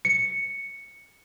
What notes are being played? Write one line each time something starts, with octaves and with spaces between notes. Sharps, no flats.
C#7